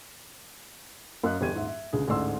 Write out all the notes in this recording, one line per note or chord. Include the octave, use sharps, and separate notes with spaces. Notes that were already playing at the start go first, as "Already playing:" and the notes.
F#2 D#5 F5 F#6
G1 E2 G4 G#6 D#7
D#1 G#2 E5
E5
C#2 D3 G#4
A1 D2 G#2 D5 C6 E6